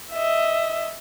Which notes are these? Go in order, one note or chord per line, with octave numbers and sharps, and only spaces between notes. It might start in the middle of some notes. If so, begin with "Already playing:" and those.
D#5 E5